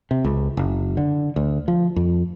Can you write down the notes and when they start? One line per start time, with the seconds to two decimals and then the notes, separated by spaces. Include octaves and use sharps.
0.11 C3
0.24 C#2
0.57 F#1
0.97 D3
1.36 D2
1.68 F3
1.96 F2